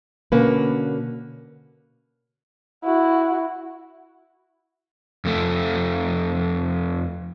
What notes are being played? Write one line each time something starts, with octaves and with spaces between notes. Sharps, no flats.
B2 D3 A#3 C#4 B4
E4 F#4
F2 A3